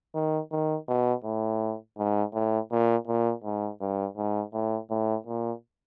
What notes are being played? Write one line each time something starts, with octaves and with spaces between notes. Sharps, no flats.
D#3
D#3
B2
A2
G#2
A2
A#2
A#2
G#2
G2
G#2
A2
A2
A#2